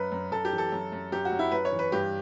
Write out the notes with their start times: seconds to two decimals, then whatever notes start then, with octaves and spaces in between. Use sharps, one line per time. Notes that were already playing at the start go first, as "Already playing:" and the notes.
Already playing: F#2 B4
0.12 F#2
0.32 F#2 A4
0.45 G4
0.52 E3
0.58 A4
0.72 F#2
0.92 F#2
1.12 F#2 G4
1.25 F#4
1.32 F#2
1.39 E4
1.51 F#2 B4
1.65 C#5
1.72 E3
1.79 B4
1.92 G2 G4